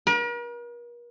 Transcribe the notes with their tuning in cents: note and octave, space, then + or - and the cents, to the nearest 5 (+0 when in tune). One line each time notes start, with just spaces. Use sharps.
A#4 +45